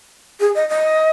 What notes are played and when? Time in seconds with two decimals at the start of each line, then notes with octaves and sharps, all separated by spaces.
0.40 G#4
0.55 D#5
0.69 D#5